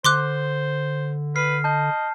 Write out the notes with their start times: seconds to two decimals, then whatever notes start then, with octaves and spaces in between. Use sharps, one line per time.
0.05 D3 C5 C6 D6 F#6
1.36 B4 F6 C7
1.64 D#5 A5 G6